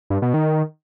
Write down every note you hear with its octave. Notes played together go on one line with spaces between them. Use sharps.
G2
B2
D#3